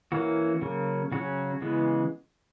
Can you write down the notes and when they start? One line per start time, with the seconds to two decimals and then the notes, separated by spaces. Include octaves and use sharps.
0.12 E3 A#3 C#4 F#4
0.62 C#3 F#3 A#3
1.12 C#3 F#3 C#4 F#4
1.62 C#3 E3 G#3 B3